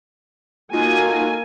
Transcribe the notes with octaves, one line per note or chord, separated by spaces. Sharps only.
A#3 D#4 F4 F#4 A4 G#5